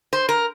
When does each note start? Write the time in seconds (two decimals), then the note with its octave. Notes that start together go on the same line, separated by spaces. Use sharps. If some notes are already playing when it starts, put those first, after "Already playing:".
0.13 C5
0.29 A#4